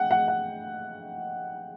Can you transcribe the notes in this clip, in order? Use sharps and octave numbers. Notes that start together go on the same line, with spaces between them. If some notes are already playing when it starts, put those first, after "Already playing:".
Already playing: F#5 G5
F#5
F#5